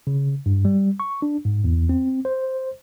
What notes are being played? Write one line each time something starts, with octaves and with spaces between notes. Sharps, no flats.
C#3
G2
G3
C#6
D4
G#2
E2
C4
C5